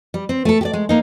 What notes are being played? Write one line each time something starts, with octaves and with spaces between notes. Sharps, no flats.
G3
C4
A3 A4
G4 D5
G#3
A#3 D#4